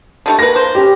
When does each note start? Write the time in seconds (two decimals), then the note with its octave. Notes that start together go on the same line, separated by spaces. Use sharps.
0.26 D3 G3 A3
0.39 A#3 B4 A#6
0.56 C5
0.75 C#4 G4